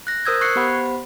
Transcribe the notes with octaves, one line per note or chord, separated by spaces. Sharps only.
F#6 A#6
A#4 C5 D#6 E6 G6 G#6
C#6 F#6 G#6 C7 C#7
B3 G4 C5 F#5 B5